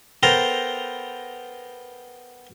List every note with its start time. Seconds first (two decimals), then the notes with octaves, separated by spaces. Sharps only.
0.23 B3 A4 A#4 C5 G5 A#5